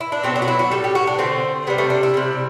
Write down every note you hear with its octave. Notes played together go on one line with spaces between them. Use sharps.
E4
D4
B2 F#3 A3 C4
D4
F#4
E4
F#4
A2 G3 A4
G4
F#4
D4
D3 A3 C4
C3 G3 B3
A3
D4
E4
C3 G3